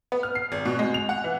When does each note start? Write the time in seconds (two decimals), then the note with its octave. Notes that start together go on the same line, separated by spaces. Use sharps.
0.12 B3
0.23 F6
0.35 C7
0.52 G#1
0.65 B2
0.79 G#3
0.94 F7
1.09 F#5
1.24 E3